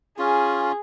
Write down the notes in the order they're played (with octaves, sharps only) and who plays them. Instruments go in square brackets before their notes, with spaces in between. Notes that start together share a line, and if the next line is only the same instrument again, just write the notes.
[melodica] C#4 F4 [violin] G#4